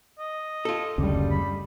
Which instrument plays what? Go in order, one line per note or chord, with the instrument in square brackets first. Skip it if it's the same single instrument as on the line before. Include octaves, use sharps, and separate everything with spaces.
[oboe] D#5
[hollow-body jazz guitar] F4 A4
[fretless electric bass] F#1 D2 C#3 [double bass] G3
[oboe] B5